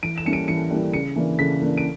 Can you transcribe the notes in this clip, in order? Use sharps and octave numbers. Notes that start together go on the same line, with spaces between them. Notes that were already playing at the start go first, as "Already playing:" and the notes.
E3 D7
E7
G3 A#3 C#4 E4 C#7
D7
E3 C#7
G3 A#3 C#4 E4
C#3 C#7
E3 A#3 D4
C#3 B6
E3 A#3 D4
D7